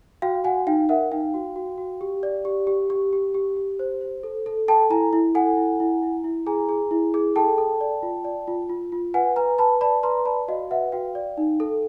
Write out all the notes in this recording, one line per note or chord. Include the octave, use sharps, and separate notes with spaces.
F#4 F5 G5
F#4 F#5 G#5
D#4 F5 G5
A#4 E5 F#5
D#4 F5 G5
F#4
F#4
F#4
G4
D5
G4
G4
G4
G4
G4
G4
C5
C5
A4
A4
A4 G5 A5
E4 G#5 A#5
E4
A4 F#5 G#5
E4
E4
E4
E4
G#4 G#5 A#5
G#4
E4
G#4
A4 G5 A5
A4
D5
F4
D5
F4
F4
F4
B4 F#5 G#5
B4 G#5 A#5
B4 A5 B5
D5 A5 B5
B4 A#5 C6
D5 A5 B5
F#4 D#5 F5
B4 E5 F#5
F#4 F5 G5
D5
D#4
A4